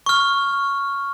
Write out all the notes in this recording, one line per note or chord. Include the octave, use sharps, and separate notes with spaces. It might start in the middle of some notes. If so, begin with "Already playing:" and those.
C#6 F6